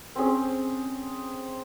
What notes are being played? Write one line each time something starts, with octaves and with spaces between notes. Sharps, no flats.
C4 C#4 G#4